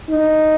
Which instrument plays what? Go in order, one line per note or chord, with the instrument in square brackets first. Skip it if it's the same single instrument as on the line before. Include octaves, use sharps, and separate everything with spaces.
[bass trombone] D#4